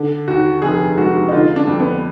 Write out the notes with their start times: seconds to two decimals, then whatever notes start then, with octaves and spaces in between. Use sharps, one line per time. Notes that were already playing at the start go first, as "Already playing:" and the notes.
Already playing: D3
0.28 D#2 F#4
0.62 F1 G#4
0.97 G#3 F#4
1.29 D#4
1.32 D3 F4
1.56 D4
1.67 F2
1.80 B3